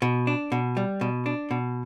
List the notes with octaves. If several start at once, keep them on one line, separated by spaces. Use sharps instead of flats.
B2
D4
B2
G3
B2
D4
B2